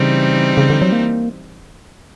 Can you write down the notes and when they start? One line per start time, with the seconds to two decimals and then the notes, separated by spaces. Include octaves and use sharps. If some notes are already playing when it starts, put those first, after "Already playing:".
Already playing: C#3 E3 G3 C4 D#4
0.57 C#3
0.70 D3
0.82 F#3
0.92 A#3